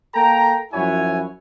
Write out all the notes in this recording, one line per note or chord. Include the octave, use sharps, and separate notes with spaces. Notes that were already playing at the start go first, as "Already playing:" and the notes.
A#3 A4 G5 A#5
F#2 F3 E4 F#4 C#5 G#5